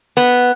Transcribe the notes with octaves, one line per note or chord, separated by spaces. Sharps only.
B3